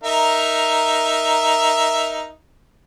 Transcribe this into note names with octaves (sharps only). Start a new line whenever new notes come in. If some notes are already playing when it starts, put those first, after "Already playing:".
D#4 A#4 E5